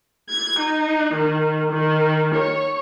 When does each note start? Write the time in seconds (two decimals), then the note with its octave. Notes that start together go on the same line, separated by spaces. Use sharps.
0.28 G#6
0.59 D#4
1.13 D#3
1.71 D#3
2.35 C#5